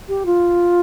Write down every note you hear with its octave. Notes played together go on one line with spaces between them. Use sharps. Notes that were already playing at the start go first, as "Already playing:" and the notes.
G4
F4